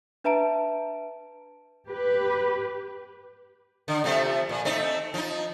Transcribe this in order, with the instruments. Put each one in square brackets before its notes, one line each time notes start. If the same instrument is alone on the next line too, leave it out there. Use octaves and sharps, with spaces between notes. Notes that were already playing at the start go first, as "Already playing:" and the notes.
[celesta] D4 B4 E5 A5 A#5 D7
[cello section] G4 B4
[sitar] D3
C3 F3 A3
A#2
A3 C4 D#4
F3 D#4